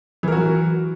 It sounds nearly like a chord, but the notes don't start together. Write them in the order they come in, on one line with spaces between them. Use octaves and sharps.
E3 A#4 F#4 F#3